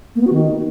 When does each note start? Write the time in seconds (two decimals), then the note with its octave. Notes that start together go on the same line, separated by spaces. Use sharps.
0.15 A#3
0.21 B3
0.27 F#4
0.33 D#3